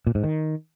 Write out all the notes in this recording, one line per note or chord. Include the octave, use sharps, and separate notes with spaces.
A#2
G#2
D#3